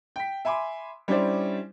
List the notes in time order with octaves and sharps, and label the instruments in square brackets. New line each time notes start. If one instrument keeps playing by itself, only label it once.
[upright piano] G5 B6
E5 G#5 B5 C6 D6
G3 C#4 D4 E4 C5 D5